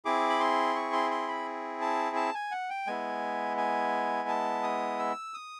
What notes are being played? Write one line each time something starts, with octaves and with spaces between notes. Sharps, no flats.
C4 E4 G#4 D6
B5
C6
C#6
C6
C6
B5
A5
A5
G#5
F#5
G5
G#3 B3 E4 G#5
G#5
A5
D#6
E6
D#6